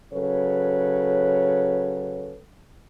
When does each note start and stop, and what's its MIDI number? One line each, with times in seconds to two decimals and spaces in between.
0.14 2.39 49
0.14 2.39 54
0.14 2.39 69
0.14 2.39 71
0.14 2.39 73